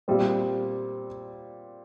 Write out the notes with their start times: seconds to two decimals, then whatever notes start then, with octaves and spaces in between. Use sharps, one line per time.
0.08 A#2 G3 C4